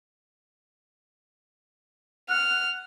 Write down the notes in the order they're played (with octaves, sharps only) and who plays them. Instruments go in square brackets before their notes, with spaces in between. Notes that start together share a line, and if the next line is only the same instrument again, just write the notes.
[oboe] F#5 [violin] F6